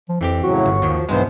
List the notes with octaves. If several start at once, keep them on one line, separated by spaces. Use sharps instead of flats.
F3
F2 E3 C4 G4
A2 C#3 F#3 F#4
G1
D#2 D#3 F3
B1 G2 E3 G#3 B3 C5